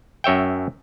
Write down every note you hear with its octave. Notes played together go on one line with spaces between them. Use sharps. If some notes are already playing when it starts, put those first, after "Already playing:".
F#2 C#5 E5 G5